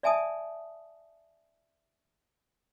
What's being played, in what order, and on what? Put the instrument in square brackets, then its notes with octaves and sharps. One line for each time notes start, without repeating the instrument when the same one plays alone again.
[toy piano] D5 E5 G#5 A5 D#6